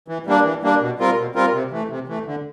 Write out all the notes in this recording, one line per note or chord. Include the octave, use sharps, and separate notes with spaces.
E3
G3 A#3 D4
E3
G3 A#3 D4
B2
G3 C4 F4 A#4
B2
G3 C4 F4 A#4
C3
E3 A3
C3
E3 A3
D3